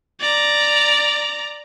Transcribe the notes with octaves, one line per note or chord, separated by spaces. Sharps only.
D5 A#5